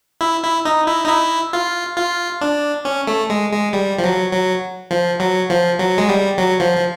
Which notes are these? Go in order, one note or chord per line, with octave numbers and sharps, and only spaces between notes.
E4
E4
D#4
E4
D#4
E4
F4
F4
D4
C#4
A3
G#3
G#3
G3
F3
F#3
F#3
F3
F#3
F3
F#3
G#3
G3
F#3
F3
F3